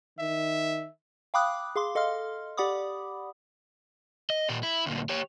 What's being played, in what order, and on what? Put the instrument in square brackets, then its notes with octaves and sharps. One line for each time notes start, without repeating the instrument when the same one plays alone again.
[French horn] D#3 [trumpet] E5
[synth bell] F5 G5 B5 D6 D#6 F#6
G#4 F5 C6 D6
A4 D#5 F5 C6 F6
G4 D5 F#5 B5 D6 D#6
[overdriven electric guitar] D#5
A#2 G4
E4
D2 A#2
G4 C#5